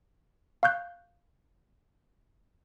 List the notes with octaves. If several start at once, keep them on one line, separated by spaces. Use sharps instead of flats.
F5 C#6 F#6 G6